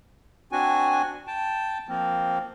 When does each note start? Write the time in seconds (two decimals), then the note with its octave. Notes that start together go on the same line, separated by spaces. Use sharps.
0.52 C4 D4 F#4 G#5
1.27 G5 A5
1.88 F3 A#3 C4